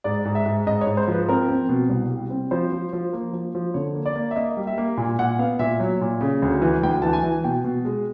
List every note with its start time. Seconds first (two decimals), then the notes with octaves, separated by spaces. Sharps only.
0.04 G#2 D5
0.25 G#2
0.35 E5
0.46 G#2
0.66 G#2 D#5
0.81 C#5
0.87 G#2
0.97 C5
1.08 F3 B4
1.29 C4 A#4
1.49 C4
1.69 B2
1.89 C2
2.10 G3
2.30 C4
2.51 F3 C5
2.72 F3
2.93 F3
3.13 A#3
3.33 F3
3.55 F3
3.74 D3 C#5
3.95 A#3
4.06 D5
4.16 A#3
4.31 E5
4.36 A#3 D#5
4.57 G3
4.67 E5
4.78 A#3
4.97 A#2 G#5
5.19 A#2 F#5
5.39 B3 F5
5.59 A#2 E5
5.80 F#3
6.01 A#2
6.21 C#3
6.42 D2
6.62 E3
6.83 D2 G5
7.02 E3 A5
7.13 G#5
7.23 E3
7.44 B2 G5
7.64 B2
7.85 G#3